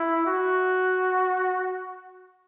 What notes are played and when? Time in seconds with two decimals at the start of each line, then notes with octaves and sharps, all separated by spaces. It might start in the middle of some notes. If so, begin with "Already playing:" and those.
Already playing: E4
0.26 F#4